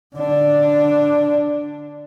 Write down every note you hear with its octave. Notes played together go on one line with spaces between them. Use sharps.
D3 D4